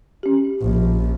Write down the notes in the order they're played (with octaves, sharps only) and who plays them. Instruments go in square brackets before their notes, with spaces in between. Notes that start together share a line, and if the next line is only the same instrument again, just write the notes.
[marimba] C#4 G4
[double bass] A#1